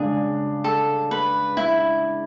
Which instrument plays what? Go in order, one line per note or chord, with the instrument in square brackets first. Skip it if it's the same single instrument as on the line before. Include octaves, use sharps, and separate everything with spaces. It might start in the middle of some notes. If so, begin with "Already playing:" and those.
Already playing: [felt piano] C#3 G#3 D4 [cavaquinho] G#4
[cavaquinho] A4
B4
E4